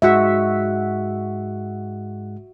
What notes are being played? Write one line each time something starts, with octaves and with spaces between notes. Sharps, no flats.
G#2 G#3 F#4 E5 F#5